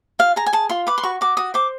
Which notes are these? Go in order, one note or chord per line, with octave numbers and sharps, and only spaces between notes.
F4 F5
G#4 A#5
G#5
G#4 A5
F4 C6
B4 D6
C6
F#4 C#6
F#4 D6
F#4 D#6
C5 D6